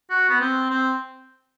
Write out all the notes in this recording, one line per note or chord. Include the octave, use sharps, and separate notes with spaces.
F#4
B3
C4
C4